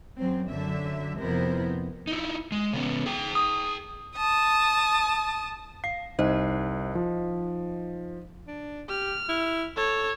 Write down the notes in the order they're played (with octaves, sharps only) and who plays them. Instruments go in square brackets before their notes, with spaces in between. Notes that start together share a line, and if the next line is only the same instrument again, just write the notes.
[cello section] F#2 F#3 C4
F#2 D3 F#3 E5
F2 C3 B3 E4 A#4 C5
[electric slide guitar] D#4 E4
G#3
C#3 B3 C#4
G#4 G5
[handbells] D#6
[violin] A5 D#6
[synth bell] F5 [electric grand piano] C7
[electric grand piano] C2 [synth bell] D#4 C5 D#5
[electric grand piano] F3
[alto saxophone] D4
[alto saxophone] G4 [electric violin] F6
[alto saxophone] E4
[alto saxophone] A4 [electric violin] C#5